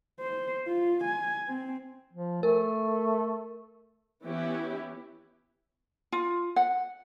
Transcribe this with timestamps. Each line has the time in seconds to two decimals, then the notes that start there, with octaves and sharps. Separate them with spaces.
0.20 C5
0.67 F4
1.04 G#5
1.48 C4
2.13 F3
2.43 A3 A#4
4.25 E3 B3 C#4 E4 G4
6.12 F4
6.56 F#5